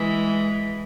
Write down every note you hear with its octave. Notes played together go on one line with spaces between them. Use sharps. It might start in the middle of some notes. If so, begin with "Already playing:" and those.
Already playing: E3 G#3